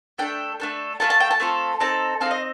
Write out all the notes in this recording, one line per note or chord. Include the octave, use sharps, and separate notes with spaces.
A3 D4 A4 G5
A3 D4 A4
A3 C4 F4 A4 A5
A5
G5
A5
A3 C4 F4 A4
C4 D#4 A4 A5
C4 D#4 A4 F5
D#5